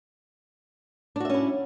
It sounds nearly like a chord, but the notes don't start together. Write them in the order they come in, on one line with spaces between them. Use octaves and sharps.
D4 F#4 E5 C#4 E4